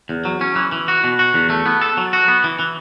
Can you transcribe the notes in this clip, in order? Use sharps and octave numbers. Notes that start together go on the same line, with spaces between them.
E2
F#3
C#4
E3
E3
F#4
B2
F#4
E2
A3
B3
A4
F#3
F#4
B3
E3
E3